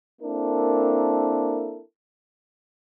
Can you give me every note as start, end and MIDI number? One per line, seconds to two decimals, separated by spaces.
0.22 1.82 58
0.22 1.82 60
0.22 1.82 62
0.22 1.82 64
0.22 1.82 69
0.22 1.82 70